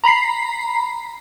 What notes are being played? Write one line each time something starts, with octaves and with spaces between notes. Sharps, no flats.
A#5 B5 B6 C7